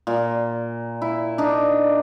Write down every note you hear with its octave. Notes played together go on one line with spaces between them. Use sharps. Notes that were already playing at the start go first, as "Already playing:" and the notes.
A#2
E4
D4 D#4